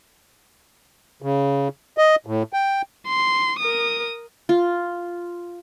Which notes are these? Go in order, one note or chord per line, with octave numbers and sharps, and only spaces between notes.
C#3
D#5
A2
G5
C6
A#4 D#6
F4